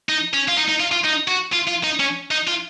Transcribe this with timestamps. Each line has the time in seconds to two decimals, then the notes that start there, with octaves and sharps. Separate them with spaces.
0.09 D#4
0.33 C#4
0.48 F4
0.57 D#4
0.69 D#4
0.80 F4
0.92 F4
1.04 D#4
1.28 F#4
1.53 F4
1.67 F4
1.84 D#4
2.00 C#4
2.31 D#4
2.47 F4